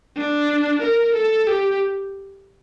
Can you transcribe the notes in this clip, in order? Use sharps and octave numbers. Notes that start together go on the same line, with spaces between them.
D4
A#4
A4
G4